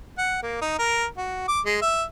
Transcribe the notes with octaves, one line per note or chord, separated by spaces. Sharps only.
F#5
A#3
D#4
A#4
F#4
D6
G#3
E5